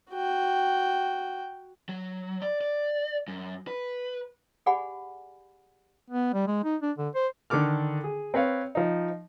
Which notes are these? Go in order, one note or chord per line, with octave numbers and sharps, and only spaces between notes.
F#4 G5
F#3
D5
D5
F#2
B4
G4 G#4 D5 F#5 G#5 B5
B3
G3
G#3
D#4
D4
D3
C5
D3 D#3 A4 D6 F6
G#4
C4 B4 C#5 F5
F3 D#4